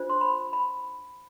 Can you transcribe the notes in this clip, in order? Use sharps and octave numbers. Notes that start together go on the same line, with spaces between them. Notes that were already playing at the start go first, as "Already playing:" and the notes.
Already playing: D4 F4 C5
C6
B5
B5